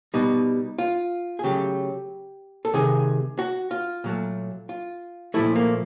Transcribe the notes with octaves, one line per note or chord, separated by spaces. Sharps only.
B2 G3 D#4
F4
G#4
C#3 F#3 A3 G4
A4
C3 D#3 G#3 G#4
F#4
F4
A#2 F#3 A3
F4
A#2 F3 A3 E4
A#3